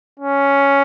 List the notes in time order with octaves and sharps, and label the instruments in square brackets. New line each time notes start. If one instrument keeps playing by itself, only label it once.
[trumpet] C#4